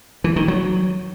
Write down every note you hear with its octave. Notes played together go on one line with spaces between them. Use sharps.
E3
D#3
F#3